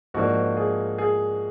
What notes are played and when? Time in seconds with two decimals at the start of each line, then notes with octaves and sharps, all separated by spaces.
0.14 G#2 F3 A#3 D4 F#4
0.57 G#4
0.98 G#4